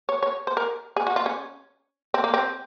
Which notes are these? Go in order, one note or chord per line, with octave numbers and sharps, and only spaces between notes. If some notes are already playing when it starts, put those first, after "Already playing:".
C#5
C#5
C5
A#4
G#4
F#4
F4
C#4
C4
A#3
C4